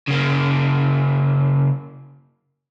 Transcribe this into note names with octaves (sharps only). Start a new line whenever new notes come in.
C#3 A#3